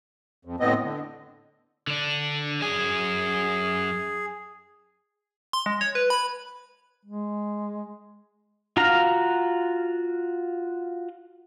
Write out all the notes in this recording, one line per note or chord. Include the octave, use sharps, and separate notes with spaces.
F2
D2 A2 B3 C4 D#5
D3
D3 D4
F#2 G#4 G#5
C6
G#3
C#5
B4
B5
G#3
F4 F#4 F5 A#5